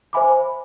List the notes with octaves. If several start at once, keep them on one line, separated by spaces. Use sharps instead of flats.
C5 E5 G#5 B5 D6